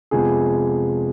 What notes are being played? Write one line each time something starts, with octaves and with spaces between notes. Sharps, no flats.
F2 C3 F3 G#3 B3 G#4